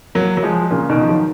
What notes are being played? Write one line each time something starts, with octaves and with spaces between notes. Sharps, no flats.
F#3 A#3
F#3
F3 G#3
A#2 C#3
B2 D#3
F3
D#3 F#3